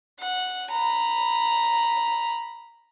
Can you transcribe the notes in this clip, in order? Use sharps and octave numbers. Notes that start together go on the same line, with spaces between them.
F#5
A#5 B5